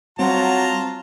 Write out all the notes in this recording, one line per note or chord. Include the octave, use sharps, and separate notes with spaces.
F#3 G3 C4 F4 C5 F#5 A5 A#5